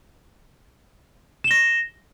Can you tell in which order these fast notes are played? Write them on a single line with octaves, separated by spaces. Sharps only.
E7 G7 A#6